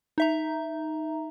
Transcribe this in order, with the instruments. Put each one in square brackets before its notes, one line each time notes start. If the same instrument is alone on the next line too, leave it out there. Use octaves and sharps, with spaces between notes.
[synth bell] D#4 E5 A#5